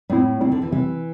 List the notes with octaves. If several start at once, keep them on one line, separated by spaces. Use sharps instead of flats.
A2 G3 C4 E4
C3 G3 C4 E4
D3
E3
C3 E3 G3 C4